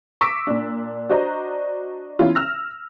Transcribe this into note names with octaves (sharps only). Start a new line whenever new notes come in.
C#6 D6 E6 A#6 B6 D7
A#2 D4
D4 F#4 C5 D#5 A#5
E3 B3 C#4 E4 F4
E6 F6 A#6